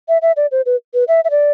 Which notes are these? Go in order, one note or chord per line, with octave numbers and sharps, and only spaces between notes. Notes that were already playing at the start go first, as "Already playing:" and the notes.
E5
E5
D5
C5
B4
B4
E5
E5
D5